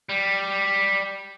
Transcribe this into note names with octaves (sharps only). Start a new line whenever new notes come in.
G3